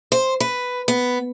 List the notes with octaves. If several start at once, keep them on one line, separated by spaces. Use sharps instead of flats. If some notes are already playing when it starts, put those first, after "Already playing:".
C5
B4
B3